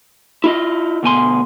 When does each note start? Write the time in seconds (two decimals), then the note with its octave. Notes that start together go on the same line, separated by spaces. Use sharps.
0.44 E4 F4 D#5
1.03 D2 B2 G#5 C6